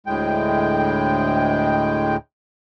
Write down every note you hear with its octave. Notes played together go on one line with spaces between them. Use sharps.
D2 A2 G#3 G5